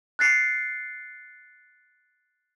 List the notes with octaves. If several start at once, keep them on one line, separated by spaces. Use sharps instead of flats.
F#6 A6 C7 C#7